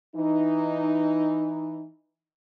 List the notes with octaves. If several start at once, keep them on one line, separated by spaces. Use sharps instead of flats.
E3 D#4